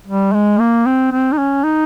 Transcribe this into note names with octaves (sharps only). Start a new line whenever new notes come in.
G3
G#3
A#3
C4
C4
D#4
C#4
D#4